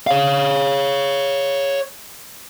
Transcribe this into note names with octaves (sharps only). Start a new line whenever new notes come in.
C#5 F5